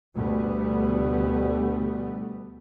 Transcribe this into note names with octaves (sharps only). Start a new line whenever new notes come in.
D2 B2 G3 A3 B3